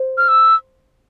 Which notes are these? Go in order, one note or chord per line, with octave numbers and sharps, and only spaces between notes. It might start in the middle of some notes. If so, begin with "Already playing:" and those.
Already playing: C5
F6
E6